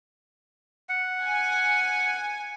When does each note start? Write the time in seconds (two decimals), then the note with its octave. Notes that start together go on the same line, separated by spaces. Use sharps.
0.89 F#5
1.24 G#5